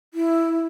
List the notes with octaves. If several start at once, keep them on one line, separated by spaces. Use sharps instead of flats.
E4